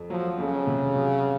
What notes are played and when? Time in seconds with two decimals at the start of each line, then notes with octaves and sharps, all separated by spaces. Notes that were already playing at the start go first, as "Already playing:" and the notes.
Already playing: F2
0.10 F3 F#3
0.38 F2 C#3
0.67 C3
0.95 F#3